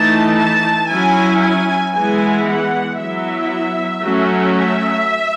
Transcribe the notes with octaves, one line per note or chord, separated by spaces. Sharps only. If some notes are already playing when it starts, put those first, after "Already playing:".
Already playing: E3 A3 D#4 A5
A5
F#3 C#4 E4 G#5
G#5
E3 G#3 B3 E4 G#5
F#5
F#3 B3 E4 E5
F#3 A3 C#4
E5